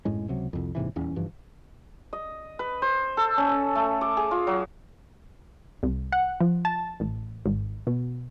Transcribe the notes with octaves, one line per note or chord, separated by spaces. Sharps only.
G#1 F#2 A2 G#3
C#2 C3 F#3
C2 F2
A#1 G#2 C3 E3
D#1 E2 C#4
F#1 G2 E3 F3
D#5
B4
C5
A4
C#4
A3
D6
G#4
F4
F#3
C2
F#5
F3
A5
A1
G#1
B2